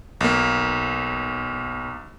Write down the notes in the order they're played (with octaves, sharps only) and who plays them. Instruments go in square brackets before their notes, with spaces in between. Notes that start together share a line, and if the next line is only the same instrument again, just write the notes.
[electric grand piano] B1 A#3